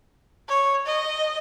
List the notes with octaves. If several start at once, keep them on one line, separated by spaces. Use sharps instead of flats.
C#5
D#5